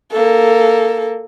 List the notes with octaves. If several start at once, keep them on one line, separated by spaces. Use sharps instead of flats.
A#3 A4